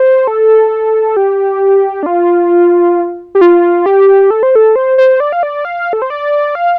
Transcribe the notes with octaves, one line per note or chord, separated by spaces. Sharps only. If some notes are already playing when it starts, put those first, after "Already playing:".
Already playing: C5
A4
G4
D4
F4
G4
F4
G4
A4
C5
A4
C5
C5
D5
F5
D5
F5
A4
C5
D5
F5